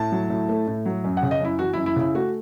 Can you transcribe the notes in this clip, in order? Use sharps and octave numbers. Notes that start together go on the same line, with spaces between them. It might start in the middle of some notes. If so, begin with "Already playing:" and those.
Already playing: A2 A5
F#3
A2
A3
A2
F#3
F#2
F#5
C#3
D#5
F#2 E4
E3 F#4
F#2 E4
E4
C#3 E4
A3 F#4